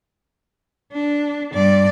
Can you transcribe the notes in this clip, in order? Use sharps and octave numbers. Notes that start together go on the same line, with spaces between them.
D4
G2 D5